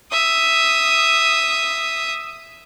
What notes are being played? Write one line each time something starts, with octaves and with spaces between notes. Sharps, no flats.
E5 D#6